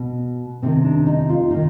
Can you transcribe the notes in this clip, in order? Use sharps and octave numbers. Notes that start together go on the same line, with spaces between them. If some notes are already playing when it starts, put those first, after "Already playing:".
Already playing: B2
C3 D#3 C4
D4
D#4
F4
C3 D#3 D#4